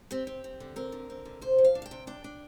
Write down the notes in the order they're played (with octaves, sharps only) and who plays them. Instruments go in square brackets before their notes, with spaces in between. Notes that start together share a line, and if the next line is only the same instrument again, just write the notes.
[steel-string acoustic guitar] C4 G4
C4
C4
D3
C4 A#4
D3
C4
D3
C3 C5
F3
F5
D4
F5
G5
C3
D4 G5
D4